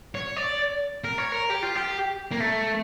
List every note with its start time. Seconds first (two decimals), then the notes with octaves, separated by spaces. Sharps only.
0.15 C#5
0.36 D5
1.04 A#4
1.18 C#5
1.32 A#4
1.50 G4
1.63 F4
1.75 G4
2.31 A#3
2.40 A3